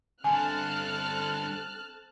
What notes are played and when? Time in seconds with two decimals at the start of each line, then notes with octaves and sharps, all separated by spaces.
0.24 G2 D3 C4 A4 G#5 A5 F6 F#6